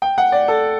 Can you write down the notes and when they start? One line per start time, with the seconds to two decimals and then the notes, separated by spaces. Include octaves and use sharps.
0.02 G5
0.18 F#5
0.32 D5
0.48 A4